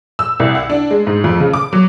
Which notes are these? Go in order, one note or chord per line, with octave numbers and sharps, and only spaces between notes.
E6
C2
F#5
D4
G#3
G#2
F2
C#3
D6
F#3